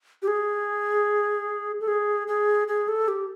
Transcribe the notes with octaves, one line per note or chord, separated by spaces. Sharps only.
G4
G#4
A4
G#4
G#4
G#4
A4
G4